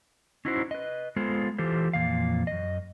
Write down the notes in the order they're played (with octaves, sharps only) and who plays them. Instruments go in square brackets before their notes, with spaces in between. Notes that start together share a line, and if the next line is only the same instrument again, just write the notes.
[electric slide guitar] C#4 D#4 E4 F#4 C5
B4 D#5
G#3 B3 F4 A4 C5
E3 F4 G4 A4 C5
F2 A#2 E3 F5
F#2 D#5